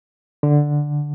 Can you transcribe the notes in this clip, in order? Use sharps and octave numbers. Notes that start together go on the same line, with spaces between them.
D3